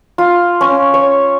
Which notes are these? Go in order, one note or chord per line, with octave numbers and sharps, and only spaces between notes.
F4
C#4
C#5